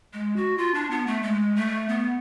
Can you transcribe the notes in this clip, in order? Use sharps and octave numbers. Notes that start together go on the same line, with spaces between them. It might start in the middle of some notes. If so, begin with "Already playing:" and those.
G#3
F#4
F4
D4
B3
A3
G#3
A3
B3